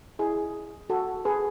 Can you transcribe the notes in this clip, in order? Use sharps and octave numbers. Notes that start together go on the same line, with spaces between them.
E4 G#4
F#4 A4
G#4 B4